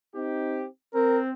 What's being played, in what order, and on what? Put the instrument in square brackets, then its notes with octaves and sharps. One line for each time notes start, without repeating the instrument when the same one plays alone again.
[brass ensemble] C4 D#4 G4
[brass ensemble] C4 [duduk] A#4